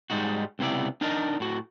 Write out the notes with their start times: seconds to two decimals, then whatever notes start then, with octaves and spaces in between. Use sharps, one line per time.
0.10 G#2 G3 G#3 D#4 F#4
0.59 C#2 C3 B3 E4 D5
1.01 D4 D#4 A#4 D5 D#5
1.40 A2 F#4